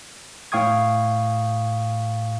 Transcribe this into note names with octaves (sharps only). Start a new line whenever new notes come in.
A2 F5 G5 C#6 D#6 G#6